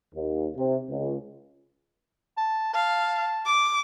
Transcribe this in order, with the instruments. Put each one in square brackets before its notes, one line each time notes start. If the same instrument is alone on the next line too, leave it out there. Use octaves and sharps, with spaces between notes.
[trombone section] D#2
C3
C#2
[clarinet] A5
[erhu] F5 [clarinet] A5
[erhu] D6